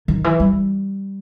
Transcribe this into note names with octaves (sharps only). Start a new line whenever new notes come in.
D#3
E3
G3